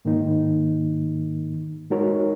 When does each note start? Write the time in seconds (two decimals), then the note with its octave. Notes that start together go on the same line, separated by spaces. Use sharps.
0.05 G#2 D#3 A#3 D#4
1.90 G#3 D#4 F#4 A#4 C#5